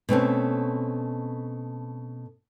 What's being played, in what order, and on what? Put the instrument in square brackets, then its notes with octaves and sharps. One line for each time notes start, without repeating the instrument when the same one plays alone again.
[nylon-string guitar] B2 A3 C4 C#4